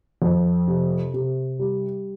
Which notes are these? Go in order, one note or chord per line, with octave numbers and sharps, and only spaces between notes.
F2
C3
C3
G3